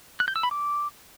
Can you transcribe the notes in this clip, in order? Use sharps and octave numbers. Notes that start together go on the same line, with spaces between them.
F#6
G6
E6
B5
D6